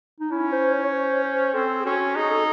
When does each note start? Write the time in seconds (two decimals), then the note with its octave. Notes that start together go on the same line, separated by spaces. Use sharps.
0.20 D#4
0.31 C#4 E4
0.52 C5
0.72 C#5
0.84 C#5
0.93 C5
1.24 C5
1.54 C4 A4
1.80 G#4
1.85 C#4 F#4
2.16 D#4 G#4
2.31 A4